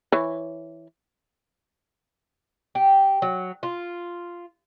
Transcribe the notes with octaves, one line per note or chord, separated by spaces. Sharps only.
E3 C#5
G4
F#3
F4